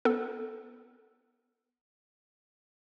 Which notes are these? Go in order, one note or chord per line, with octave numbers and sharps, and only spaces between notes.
B3 A4